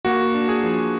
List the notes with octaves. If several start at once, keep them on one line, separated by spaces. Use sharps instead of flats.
A#3 F#4
D4
G#4
F3